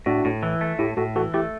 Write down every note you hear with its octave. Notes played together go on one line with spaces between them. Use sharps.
A2 D4 F#4
A2
E3
A3
A2 E4 G4
A2 F#4 A4
E3 F#4 A4
A3 E4 G4